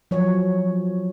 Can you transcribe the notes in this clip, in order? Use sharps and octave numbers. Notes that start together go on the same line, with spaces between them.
F3 F#3 C#5